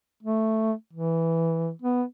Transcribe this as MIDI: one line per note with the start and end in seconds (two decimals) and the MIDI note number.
0.23 0.73 57
0.93 1.71 52
1.82 2.03 59